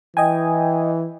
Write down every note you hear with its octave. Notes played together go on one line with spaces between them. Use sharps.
E3 D#5 G5 G#5